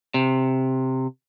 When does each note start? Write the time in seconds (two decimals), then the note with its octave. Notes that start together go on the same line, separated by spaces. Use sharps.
0.14 C3